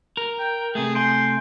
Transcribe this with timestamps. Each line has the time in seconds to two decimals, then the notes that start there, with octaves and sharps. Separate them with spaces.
0.17 A#4
0.39 G5
0.75 C3 A3 G#4
0.95 G#5 C6 G6 D7